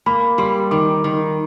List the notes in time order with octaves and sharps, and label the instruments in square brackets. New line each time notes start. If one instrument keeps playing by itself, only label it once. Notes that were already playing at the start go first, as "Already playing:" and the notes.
[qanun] A#3 [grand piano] B5
[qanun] G3 [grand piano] C6
[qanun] D#3 [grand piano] D6
[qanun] D#3